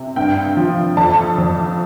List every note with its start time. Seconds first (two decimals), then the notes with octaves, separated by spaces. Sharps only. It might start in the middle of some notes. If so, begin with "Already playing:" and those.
Already playing: C3
0.16 G2 G5
0.57 F3
0.97 F2 A5
1.38 F2